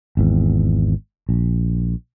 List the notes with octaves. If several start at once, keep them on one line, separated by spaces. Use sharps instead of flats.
G#1 E2
A#1